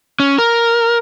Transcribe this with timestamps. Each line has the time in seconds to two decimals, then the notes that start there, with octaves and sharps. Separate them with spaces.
0.20 C#4
0.38 A#4